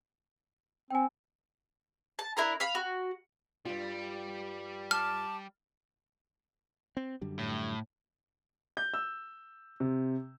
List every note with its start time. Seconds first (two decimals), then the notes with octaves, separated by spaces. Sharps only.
0.90 C4 G5 G#5
2.19 A5
2.37 D4 E4 A#4 A#5
2.60 F5 B5
2.75 F#4
3.65 G2 G3 F4
4.91 A5 D6 F6
6.97 C4
7.21 F#2 D3 G3
7.39 A2
8.77 G6
8.94 E6
9.80 C3